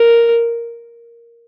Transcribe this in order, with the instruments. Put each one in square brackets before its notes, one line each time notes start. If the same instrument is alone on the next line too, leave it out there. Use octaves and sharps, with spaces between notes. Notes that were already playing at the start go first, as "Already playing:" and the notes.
Already playing: [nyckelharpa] A#4